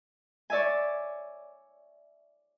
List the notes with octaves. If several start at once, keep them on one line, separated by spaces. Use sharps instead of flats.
C#5 D5 E5 G#5